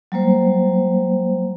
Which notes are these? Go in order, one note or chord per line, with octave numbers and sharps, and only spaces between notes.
F#3 G3 A#3 C5